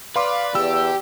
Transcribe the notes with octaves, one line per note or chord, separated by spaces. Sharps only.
B4 D5 F5 C6 D6
E2 G4 E6